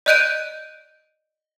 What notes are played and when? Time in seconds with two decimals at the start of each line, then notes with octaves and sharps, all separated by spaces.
0.06 D5 D#5 F#6 G6 D7 D#7